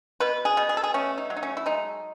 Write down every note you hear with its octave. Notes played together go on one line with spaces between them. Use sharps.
B2 B4
G#4
B2
G#4
A4
G#4
A3 C#4
D#4
F#3
D#4
C#4
E4
G#3 D#4